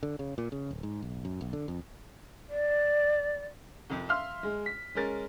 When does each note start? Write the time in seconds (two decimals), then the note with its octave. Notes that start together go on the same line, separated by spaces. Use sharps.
0.03 D3
0.19 C#3
0.38 A#2
0.52 C#3
0.71 D1
0.83 G#2
1.03 B1
1.25 F#2
1.41 B1
1.53 D3
1.68 F2
2.50 D5
3.90 C2 F2
4.09 E5 F5 C6 F6
4.43 G#3
4.66 B6
4.95 G#3 C#4 A#4 A6